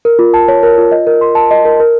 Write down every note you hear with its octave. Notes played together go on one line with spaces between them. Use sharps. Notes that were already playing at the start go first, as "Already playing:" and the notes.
A#4
F4
A5
C#5
A#4
F4
D#5
A#4
C6
A5
D#5
A#4
A#4